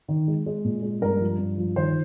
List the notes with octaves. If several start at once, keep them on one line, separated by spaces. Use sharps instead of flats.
D#3
G#3
G#3
A#2
G#3
G2 A#4
F3
G2
F3
D#3 C5